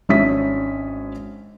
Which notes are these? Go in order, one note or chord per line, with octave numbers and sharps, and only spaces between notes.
G#1 C#4 D4 E5 D#6 B6